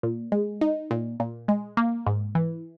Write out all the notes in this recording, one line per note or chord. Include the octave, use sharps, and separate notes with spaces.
A#2
G#3
D#4
A#2
A#2
G#3
A#3
G#2
E3